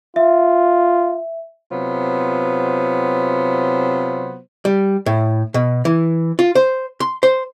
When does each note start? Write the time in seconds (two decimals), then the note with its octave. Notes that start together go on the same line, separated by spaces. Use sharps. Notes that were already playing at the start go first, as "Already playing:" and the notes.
0.16 F4 E5
1.71 C3 F#3 B3 F4 C5
4.65 G3
5.06 A2
5.54 B2
5.85 E3
6.39 F4
6.55 C5
7.00 C6
7.23 C5